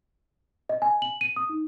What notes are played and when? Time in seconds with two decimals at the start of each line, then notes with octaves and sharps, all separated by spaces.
0.69 D#5
0.82 G#5
1.02 F#7
1.21 D#7
1.36 D#6
1.49 D#4